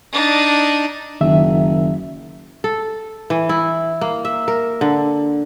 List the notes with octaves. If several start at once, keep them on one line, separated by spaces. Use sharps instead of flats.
D4 D#4
F#1 D#3 E5
A4
E3
E4
A#3
E5
A#4
D3